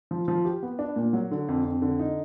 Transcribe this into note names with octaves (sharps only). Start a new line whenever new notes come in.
F3
F3
G4
B3
D4
A#2
F#3
D3
F2
F2
D3
D#4